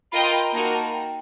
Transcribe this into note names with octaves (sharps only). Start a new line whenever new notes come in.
F4 A#4 D#5 G5 B5
C6
B5
A#5
A#3 D#4 F#4 A#4 A5
A5
G5